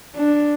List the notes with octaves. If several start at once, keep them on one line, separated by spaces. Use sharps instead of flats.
D4